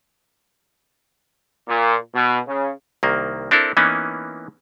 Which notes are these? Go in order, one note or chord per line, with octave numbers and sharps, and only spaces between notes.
A#2
B2
C#3
C2 D#3 A#3
C4 D4 E4 A4 A#4
E3 A#3 B3 C#4 D#4